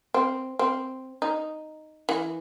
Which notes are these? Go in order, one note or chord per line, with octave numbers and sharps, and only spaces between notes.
C4
C4
D#4
E3